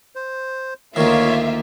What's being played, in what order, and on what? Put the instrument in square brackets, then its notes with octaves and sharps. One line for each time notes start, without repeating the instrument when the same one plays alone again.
[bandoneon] C5
[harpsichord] D2 D#3 [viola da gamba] A#3 [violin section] F4 E5 F5 [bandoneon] C#5